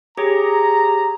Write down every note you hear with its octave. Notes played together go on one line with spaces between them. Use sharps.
G4 G#4 C#5 A#5